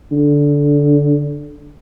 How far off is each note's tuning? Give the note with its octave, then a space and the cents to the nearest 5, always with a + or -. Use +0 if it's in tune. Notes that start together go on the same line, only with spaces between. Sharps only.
D3 -15